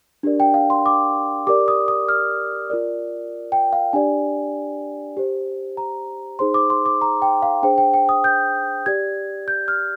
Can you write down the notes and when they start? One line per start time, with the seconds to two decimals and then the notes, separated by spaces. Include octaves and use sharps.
0.23 D4 G4 A#4 D5
0.40 G5
0.54 F5
0.70 C6
0.86 D6
1.47 G4 A#4 D5 D6
1.68 D#6
1.88 D#6
2.09 F6
2.70 F4 A#4 D5
3.52 G5
3.73 F5
3.93 D4 G4 D5 G#5
5.17 G4 C5
5.77 A#5
6.39 D#4 G#4 C5 C6
6.54 D6
6.70 C6
6.86 D6
7.01 A#5
7.22 G5
7.42 F5
7.63 D4 G#4 C5 G5
7.78 G5
7.94 G5
8.09 D#6
8.24 G6
8.86 G4 D5 G#6
9.48 G6
9.68 F6